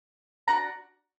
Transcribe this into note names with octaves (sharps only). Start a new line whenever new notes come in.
D4 F#4 F#5 A#5